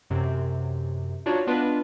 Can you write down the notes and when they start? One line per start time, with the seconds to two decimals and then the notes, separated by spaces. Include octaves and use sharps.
0.10 F#2 C3
1.26 D4 D#4 F4 F#4 C#5 D5
1.47 B3 D4 F4 B4 D#5